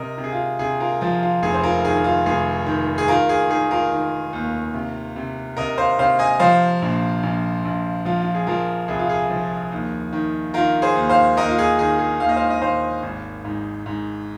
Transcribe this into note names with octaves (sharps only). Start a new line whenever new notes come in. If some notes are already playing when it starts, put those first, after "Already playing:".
Already playing: C3 A#4 D#5
C3
G#4
F4
C3 G#4
F4 A#4
F3 F4
F4
F1 G#4
C5
F4 A#4
D#3 G#4
F4
F1 G#4
D#3
G#4
D#3 F4 A#4
G#4
D#3 G#4
F4 A#4
D#3
D#2
C3
C3
C3 A#4 D#5
C5 F5
C3 C5 F5
D#5 G#5
F3 C5 F5
A#1
A#1
A#1
F3 F4
F4
G#4
F3 F4 A#4
C2 G#4
F4
G#4
F3
D#2
D#3
D#3 F4 A#4
G#4 C5
D#2
C5 F5
D#2 A#4 D#5
F4
G#4
D#3 G#4
G#4
D#2 F5
D#5
C5 F5
D#5
D#2 C5 F5
G#1
G#2
G#2